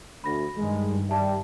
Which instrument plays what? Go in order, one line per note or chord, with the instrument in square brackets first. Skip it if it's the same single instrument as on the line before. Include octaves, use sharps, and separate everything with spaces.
[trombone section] D2 [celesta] B5 A#6
[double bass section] G2 D#3 [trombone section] G#3
[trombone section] G3 [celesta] E5 A5